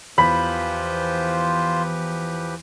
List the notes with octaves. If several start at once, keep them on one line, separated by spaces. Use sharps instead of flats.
E2 F3 F4 G4 B4 C5 B5